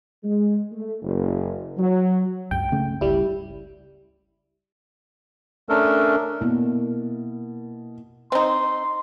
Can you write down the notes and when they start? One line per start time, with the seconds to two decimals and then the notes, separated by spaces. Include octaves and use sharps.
0.24 G#3
0.72 A3
1.02 F#1
1.78 F#3
2.51 C#2 G2 G5
2.72 C#3 A3 C#4
3.01 G1 C#2 G3 E4
5.69 A3 C#4 D4 A4 A#4
6.41 B2 A#3 E4
8.32 C4 D#4 C6